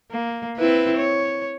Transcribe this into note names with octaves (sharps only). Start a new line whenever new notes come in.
A#3
C4 E4 B4
C#5